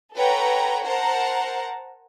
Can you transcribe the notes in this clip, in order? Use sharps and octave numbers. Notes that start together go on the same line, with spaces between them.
A4 B4 C#5 F#5 G5 A#5
A#4 C5 F#5 A5 A#5